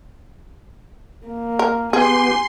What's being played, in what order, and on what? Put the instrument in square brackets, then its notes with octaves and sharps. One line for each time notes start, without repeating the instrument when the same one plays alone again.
[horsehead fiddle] A#3
[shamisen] A#4
[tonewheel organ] B3 G4 [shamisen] G#4 [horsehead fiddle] G#5 [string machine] C6